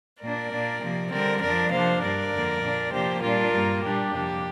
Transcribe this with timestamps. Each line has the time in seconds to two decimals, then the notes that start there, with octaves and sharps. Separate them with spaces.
0.22 A#2 A#3 D4 A#4 D5
0.51 A#2 A#3 D4
0.82 C3 F3 A#3
1.11 D3 G3 C4 A#4 D5
1.42 F2 F3 D4 A#4 D5
1.71 C3 F3 A#3 D4 C5 F5
2.01 G2 G3 D4 A#4 D5
2.32 F2 D3 A#3
2.62 A#2 A#3 D4
2.92 C3 F3 A#3 D4 G4 C5
3.22 A#2 G3 D4 F4 A#4
3.53 G2 G3 A#3
3.83 A#2 G3 D4 G4
4.12 F2 C3 A#3 D4